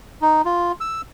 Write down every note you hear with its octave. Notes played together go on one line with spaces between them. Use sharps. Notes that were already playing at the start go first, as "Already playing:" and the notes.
D#4
F4
E6